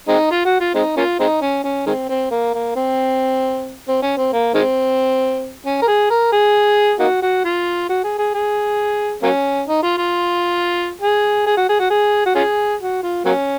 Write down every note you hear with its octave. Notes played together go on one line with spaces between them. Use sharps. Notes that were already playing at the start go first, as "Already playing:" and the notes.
G#3 C4 D#4
F4
F#4
F4
G#3 C4 D#4
A#3 C#4 F4
G#3 C4 D#4
C#4
C#4
D#3 G#3 C4
C4
A#3
A#3
C4
C4
C#4
C4
A#3
D#3 G#3 C4
C#4
A#4
G#4
A#4
G#4
A#3 D#4 F#4
F#4
F4
F#4
G#4
G#4
G#4
F#3 A#3 C#4
D#4
F4
F4
G#4
G#4
F#4
G#4
F#4
G#4
F#4
C#4 F4 G#4
F#4
F4
F#3 A#3 C#4